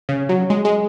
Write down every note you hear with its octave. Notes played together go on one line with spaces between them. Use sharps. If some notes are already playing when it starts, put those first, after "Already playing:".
C#3
F#3
G#3
G#3